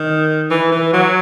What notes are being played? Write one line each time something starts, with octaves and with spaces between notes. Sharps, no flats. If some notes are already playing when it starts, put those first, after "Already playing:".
Already playing: D#3
E3
E3
F#3